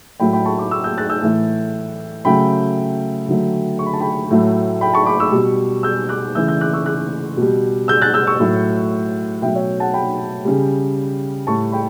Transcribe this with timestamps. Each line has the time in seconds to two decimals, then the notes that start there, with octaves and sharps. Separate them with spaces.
0.20 A2 F#3 A3 G5 B5
0.33 G5 B5
0.45 A5 C#6
0.58 B5 D6
0.71 C#6 E6
0.84 E6 G6
0.98 F#6 A6
1.10 E6 G6
1.22 A2 E3 A3
2.25 C#3 F#3 A3 G5 B5
3.28 D3 F#3 A3
3.79 C#6
3.86 B5
3.93 A5
4.00 G5 B5
4.31 A2 F#3 A3
4.81 G5 B5
4.93 A5 C#6
5.06 B5 D6
5.20 C#6 E6
5.32 B2 G3
5.83 E6 G6
6.09 D6 F#6
6.35 C#3 E3 A3 E6 G6
6.47 E6 G6
6.61 D6 F#6
6.73 C#6 E6
6.86 D6 F#6
7.37 B2 G3
7.88 E6 G6
8.01 F#6 A6
8.14 E6 G6
8.27 C#6 E6
8.40 A2 F#3 A3
9.42 B2 F#3 A3 E5 G5
9.55 C#5 E5
9.80 F#5 A5
9.94 G5 B5
10.45 C#3 G3
11.47 A2 G3 A5 C#6
11.72 G5 B5